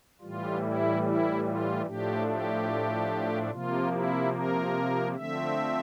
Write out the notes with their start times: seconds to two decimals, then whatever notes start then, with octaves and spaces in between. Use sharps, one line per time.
0.21 A2 E3 G3 F4
0.62 E4
1.03 E4
1.45 F4
1.85 A2 F3 A3 D4 G4
2.27 G4
3.51 C3 F3 A#3 F4
3.92 E4
4.34 A#4
5.16 D3 F3 A3 C4 E5